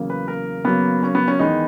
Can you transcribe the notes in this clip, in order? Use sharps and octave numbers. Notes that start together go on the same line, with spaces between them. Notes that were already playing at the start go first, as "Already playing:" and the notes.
Already playing: E2 C#3 F#3 A#3
B4
A#4
C#3 F#3 A#3 B3
C#4
B3
C#4
E2 D#3 G#3 B3 D#4